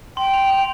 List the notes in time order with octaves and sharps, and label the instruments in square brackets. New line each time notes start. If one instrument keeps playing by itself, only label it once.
[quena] G5 [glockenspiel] C6
[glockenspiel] F7
C6